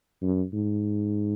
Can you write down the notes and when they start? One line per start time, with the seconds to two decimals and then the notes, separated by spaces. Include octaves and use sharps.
0.22 F#2
0.53 G#2